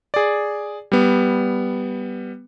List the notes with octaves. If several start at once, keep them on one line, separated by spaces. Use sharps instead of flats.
G#4 D5
G3 B3